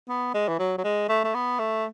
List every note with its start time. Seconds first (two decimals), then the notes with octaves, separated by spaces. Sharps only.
0.09 B3
0.34 G#3
0.48 E3
0.59 F#3
0.78 F#3
0.84 G#3
1.09 A3
1.25 A3
1.35 B3
1.59 A3